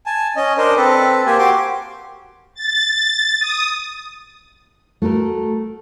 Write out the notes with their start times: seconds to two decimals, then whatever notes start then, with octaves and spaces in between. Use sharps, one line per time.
0.06 G#5 A5
0.36 C#4 D#5
0.58 D4 A#4 C5 D#5
0.76 C4 A4 B4
1.26 A#3 G4 C5 G#5
1.38 F#4 G4 C6 D6
2.55 A6
3.39 D#6
5.02 A3 F#4 A4 A#4